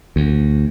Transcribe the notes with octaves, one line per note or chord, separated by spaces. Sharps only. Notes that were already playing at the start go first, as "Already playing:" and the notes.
D2